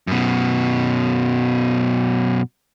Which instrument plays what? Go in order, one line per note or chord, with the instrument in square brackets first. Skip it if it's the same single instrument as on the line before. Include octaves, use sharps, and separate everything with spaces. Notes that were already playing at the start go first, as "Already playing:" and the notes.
[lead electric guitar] F#2 B2